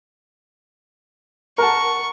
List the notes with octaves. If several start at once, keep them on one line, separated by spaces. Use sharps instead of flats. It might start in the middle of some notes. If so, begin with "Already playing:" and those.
A#4 F#5 A5 C#6